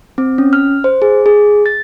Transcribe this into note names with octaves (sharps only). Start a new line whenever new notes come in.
C4
C#4
F6
C5
G#4
G#4
A6